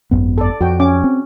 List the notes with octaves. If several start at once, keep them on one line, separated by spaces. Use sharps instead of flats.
G#1 F#2 B3
A4 D5
F2 F#4 G5
C#4 D6
C4